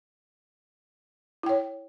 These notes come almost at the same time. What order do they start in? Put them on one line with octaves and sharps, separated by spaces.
E4 G5 C#5